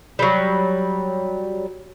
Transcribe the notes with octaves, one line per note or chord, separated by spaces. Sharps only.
F#3 G3